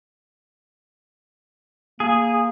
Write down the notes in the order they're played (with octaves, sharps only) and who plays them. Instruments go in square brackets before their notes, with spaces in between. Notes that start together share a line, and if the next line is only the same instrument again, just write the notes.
[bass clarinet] A#3 [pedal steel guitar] G#4